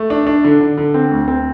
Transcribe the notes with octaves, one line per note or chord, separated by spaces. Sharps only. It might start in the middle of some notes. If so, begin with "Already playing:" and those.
Already playing: A3
D4
D4
D3
D3
D3
C4
D2
C4